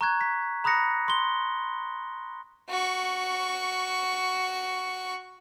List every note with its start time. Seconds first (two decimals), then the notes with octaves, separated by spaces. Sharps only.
0.01 A#5 C#6 F#6 G#6
0.21 B6
0.64 A#5 B5 D#6 F#6 A#6 C#7
1.08 C6 G7
2.69 F#4 C#6